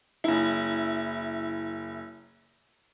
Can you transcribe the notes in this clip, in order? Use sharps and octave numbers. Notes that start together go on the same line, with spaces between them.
F#1 E4